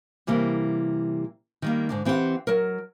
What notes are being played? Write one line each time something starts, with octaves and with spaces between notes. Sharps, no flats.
C3 E3 G3 A#3
D#3 G3 A#3
G#2 D3 D4
E3 C4 G4 D5 F#5
F#3 A#4